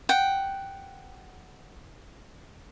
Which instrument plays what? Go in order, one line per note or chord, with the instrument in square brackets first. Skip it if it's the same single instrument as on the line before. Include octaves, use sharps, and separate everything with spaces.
[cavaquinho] F#5 G5